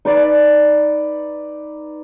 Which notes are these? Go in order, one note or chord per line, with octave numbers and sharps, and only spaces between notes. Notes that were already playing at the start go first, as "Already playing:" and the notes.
D#4 B4 D5